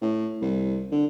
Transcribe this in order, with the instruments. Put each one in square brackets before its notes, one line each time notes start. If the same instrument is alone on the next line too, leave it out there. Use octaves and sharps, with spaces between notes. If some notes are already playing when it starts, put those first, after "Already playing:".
[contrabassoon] A2
C2
D3